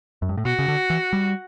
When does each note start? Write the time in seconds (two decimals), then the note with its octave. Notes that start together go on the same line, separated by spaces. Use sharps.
0.22 F#2
0.29 G2
0.37 A2
0.45 B2 F#4
0.59 C#3
0.68 D3
0.90 E3
1.13 G3